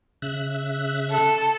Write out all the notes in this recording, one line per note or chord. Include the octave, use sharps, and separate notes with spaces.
C#3 E5 F#6
A4